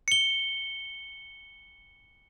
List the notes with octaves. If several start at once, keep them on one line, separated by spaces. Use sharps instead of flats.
C#7 G7